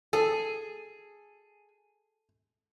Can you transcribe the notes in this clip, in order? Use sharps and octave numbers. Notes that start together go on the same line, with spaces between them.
G#4 A4